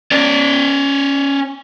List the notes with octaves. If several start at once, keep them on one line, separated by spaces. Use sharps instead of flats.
C#4 D5